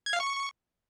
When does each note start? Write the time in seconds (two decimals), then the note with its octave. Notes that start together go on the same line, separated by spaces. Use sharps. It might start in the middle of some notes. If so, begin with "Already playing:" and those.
0.06 G#6
0.13 F5
0.20 C#6